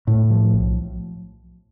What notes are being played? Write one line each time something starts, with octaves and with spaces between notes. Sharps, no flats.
A2
F3
B1